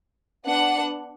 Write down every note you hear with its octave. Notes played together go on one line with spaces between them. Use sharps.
B3 D4 F#5